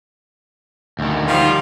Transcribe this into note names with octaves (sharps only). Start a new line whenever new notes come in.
D2 D#3
D#3 F3 G3 F4